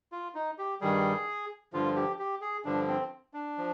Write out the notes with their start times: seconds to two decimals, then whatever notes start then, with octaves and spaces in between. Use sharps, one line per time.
0.12 F4
0.35 D#4
0.58 G4
0.81 G2 D#3 G3 G#4
1.73 G2 D3 F3 F4
1.96 G4
2.19 G4
2.41 G#4
2.65 G2 D3 F3 D4
2.88 C4
3.34 D4
3.58 F3